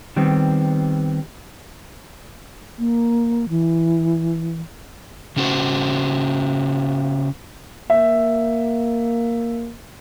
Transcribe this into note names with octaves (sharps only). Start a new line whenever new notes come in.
D#3 G3 B3 C4
A#3
E3
C#3 C#4 F#4 C5
A#3 E5